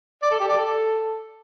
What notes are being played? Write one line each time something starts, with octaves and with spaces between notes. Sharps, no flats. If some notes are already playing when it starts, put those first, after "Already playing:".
D5
A4
G4
D5
A4